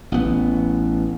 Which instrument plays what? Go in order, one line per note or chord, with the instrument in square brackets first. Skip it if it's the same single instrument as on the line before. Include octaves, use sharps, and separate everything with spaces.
[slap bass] A1 B3